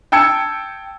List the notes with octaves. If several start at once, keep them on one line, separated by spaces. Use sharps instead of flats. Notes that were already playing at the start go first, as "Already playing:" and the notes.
G5 A5 E6 G#6 C#7 E7